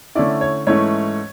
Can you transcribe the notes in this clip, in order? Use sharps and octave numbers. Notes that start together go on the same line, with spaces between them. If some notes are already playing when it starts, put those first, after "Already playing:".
D3 A3 C#4 E4 D5
C#5
G#2 E3 A3 C#4 E4 C#5